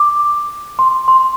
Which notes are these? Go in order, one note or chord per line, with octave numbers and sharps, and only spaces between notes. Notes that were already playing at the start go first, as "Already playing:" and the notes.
Already playing: D6
C6
C6